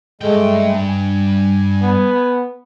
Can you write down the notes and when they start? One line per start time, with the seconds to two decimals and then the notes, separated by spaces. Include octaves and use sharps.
0.21 G2 G#3 A3 G5
0.88 G#5
1.82 B3